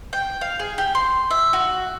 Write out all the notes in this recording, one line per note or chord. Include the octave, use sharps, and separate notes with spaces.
G5
F5
G#4
G4
C6
E5
F#4